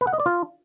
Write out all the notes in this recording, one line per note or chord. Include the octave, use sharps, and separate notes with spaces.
B4
F#5
D#5
D5
F4